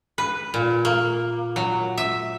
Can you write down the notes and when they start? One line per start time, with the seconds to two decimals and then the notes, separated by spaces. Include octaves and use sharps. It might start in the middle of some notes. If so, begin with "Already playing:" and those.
0.18 B4
0.54 A#2
0.85 A#3
1.56 F#3
1.98 E5